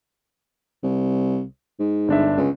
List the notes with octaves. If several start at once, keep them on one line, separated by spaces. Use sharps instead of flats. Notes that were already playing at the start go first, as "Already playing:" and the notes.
C2
G#2
G1 D4 E5
C#2